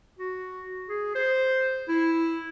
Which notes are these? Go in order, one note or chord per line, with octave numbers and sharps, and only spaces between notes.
F#4
G#4
C5
E4